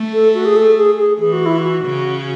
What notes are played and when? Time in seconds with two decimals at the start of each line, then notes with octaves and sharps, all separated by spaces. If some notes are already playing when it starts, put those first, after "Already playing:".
Already playing: A3
0.13 A4
0.34 F#4
0.45 G#4
0.56 A4
0.76 G#4
0.98 G#4
1.19 E3 G#4
1.33 F#4
1.46 E4
1.58 F#4
1.84 C#3